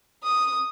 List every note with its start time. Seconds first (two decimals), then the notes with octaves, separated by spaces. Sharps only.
0.23 D#6